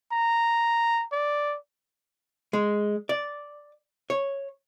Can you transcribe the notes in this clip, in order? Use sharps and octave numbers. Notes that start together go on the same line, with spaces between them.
A#5
D5
G#3
D5
C#5